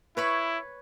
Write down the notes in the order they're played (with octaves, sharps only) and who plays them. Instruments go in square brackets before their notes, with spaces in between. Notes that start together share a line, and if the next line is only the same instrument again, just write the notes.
[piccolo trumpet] E4 [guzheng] B4 C#5 B5